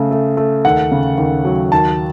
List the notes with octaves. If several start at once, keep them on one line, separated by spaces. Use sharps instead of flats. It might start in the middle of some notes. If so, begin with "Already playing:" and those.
Already playing: C#3 A3
A3
A3
D#2 F#5
C#3
D#2
F#3
D#2 A5